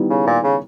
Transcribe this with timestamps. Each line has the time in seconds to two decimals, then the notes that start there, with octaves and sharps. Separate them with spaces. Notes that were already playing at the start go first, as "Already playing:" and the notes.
Already playing: D#3 G3 B3 E4
0.10 C#3
0.27 A#2
0.44 C#3